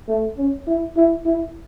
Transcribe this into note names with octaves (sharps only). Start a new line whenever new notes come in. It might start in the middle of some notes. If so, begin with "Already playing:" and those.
A3
C#4
E4
E4
E4